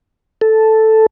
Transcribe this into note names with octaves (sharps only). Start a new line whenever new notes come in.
A4